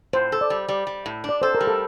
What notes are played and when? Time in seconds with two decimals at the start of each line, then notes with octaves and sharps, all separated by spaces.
0.13 A2 C5
0.32 A4
0.41 D5
0.50 G3
0.68 G3 D5
0.87 G3
1.06 A2
1.24 D4
1.29 D5
1.42 A4 C5
1.55 A#4
1.61 G3
1.67 A4